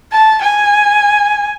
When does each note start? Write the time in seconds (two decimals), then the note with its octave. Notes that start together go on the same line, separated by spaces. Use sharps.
0.12 A5
0.41 G#5